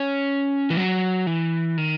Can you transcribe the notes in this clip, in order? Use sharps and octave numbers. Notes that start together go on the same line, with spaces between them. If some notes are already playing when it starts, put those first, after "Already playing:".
Already playing: C#4
E3
F#3
E3
D#3